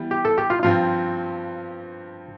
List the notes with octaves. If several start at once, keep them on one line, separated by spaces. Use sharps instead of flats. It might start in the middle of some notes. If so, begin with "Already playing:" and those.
Already playing: E3 G3 B3
G4
A4
G4
F4
G2 F3 C4 F4